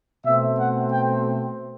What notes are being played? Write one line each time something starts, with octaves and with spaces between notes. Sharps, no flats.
B2 A3 C4 E5
F#5
G5